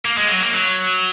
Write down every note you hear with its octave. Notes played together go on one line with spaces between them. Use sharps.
A#3
G#3
F#3
A#3
F#3